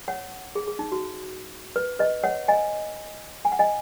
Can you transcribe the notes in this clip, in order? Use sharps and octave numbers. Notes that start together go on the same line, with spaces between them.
C#5 F#5
G#4
G#4
D#4
F#4
B4
B4 D#5
C#5 F#5
D#5 G#5
G#5
F#5
D#5 G#5